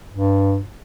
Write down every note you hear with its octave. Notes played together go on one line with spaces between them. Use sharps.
G2